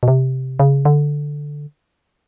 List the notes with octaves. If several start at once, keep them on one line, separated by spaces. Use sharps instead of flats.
B2
C3
C#3
D3